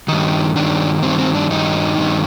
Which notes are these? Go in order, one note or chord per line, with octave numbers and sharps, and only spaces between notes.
G2 D#3 D#4
G2 D#3 D4
G2 D#3 C4
C4
D4
G2 D#3 D#4
G2 D#3